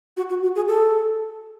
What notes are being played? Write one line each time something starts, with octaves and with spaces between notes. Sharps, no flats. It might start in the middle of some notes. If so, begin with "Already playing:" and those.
F#4
F#4
F#4
G#4
A4